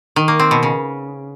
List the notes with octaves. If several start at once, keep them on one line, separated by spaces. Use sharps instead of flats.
D#3
A#3
C4
B2
C#3